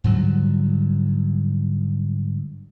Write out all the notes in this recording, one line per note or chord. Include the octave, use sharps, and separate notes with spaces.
G#2 D3 F#3 G3